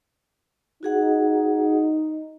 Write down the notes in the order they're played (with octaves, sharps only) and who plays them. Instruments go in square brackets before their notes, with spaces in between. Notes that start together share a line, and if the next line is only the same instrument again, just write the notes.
[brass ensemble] D#4 [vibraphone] F#4 G#4 F#5